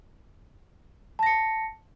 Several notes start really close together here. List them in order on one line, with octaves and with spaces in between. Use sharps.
A5 A#6 C#7